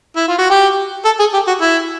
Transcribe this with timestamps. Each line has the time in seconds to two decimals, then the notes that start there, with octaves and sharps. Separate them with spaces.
0.16 E4
0.28 F4
0.38 F#4
0.50 G4
1.05 A4
1.19 G#4
1.34 G4
1.47 F#4
1.61 E4